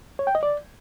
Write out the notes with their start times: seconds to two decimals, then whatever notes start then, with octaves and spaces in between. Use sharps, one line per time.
0.19 C#5
0.27 G5
0.35 D#5
0.43 D5